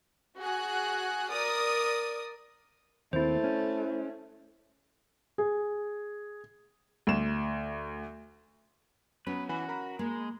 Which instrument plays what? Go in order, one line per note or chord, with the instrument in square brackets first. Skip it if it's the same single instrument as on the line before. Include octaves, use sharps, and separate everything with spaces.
[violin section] F#4 G#4 F#6
A#4 D5 D#6
[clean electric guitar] D#2 C4 [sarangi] A3 [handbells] E4 C5
[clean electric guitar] C#4
[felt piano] G#4
[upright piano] D2 E7
[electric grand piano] F#3 B3 [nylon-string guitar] C#4 [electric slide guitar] B4
[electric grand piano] E3 G#5 B5 [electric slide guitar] F#4
[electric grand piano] A#4 A#5 B5
[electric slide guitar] G#3 [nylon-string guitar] A#3